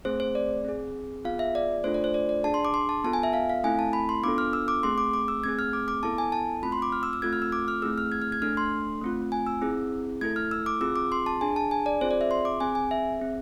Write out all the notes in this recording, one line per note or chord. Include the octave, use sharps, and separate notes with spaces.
A3 C4 G#4 C5
C5
D5
C4 G#4
B3 F4 G#4 F5
E5
D5
A3 D4 F4 A4 C5
D5
C5
D5
D5
D4 G#4 A5
C6
D6
C6
A5
B3 F4 A4 A5
G#5
E5
F5
F5
A3 C4 E4 A4 G#5
A5
B5
C6
B3 D4 F4 A4 D6
F6
E6
D6
A3 C4 G#4 C6
D6
D6
E6
A3 C4 G#4 G#6
F6
D6
D6
B3 E4 A4 A5
G#5
A5
A3 C4 F4 B5
C6
D6
F6
E6
E6
A3 C4 F4 A4 G#6
F6
E6
D6
F6
A3 C4 E4 G#4 E6
F6
G#6
F6
G#6
A3 D4 A4 F6
C6
A3 C4 F4
G#5
E6
C4 E4 G#4
A3 E4 A4 G#6
F6
E6
D6
C4 F4 G#4 E6
D6
C6
A5
D4 G#4 G#5
A5
G#5
D5
C4 F4 G#4 C5
D5
E5
C6
D6
C4 G#4 G#5
G#5
E5
C4 G#4